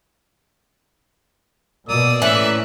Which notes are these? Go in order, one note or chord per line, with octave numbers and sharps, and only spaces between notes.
B2 A#3 D5 D#6 E6
A2 E3 C#4 E5 F#6